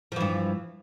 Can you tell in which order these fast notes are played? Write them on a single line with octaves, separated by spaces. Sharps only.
F3 E3 G2